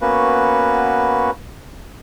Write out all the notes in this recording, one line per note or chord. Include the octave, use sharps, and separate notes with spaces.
A#3 B3 C#4 F#4 B4